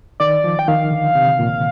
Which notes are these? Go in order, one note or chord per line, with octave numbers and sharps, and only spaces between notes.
D#3 D5
F3
G5
D#3 F5
D3
C3
A#2